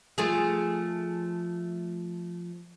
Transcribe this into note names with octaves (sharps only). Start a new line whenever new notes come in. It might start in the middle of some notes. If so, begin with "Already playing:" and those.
F3 A3 G#4